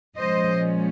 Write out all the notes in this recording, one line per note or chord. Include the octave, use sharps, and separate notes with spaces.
A#2 F3 G#3 C#4 C5 D#5